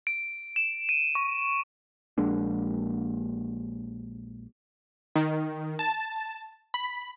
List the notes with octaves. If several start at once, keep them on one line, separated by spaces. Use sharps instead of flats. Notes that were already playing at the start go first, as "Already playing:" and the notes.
D7
E7
D#7
C#6
A#1 G#3 A#3 D4
D#3
A5
B5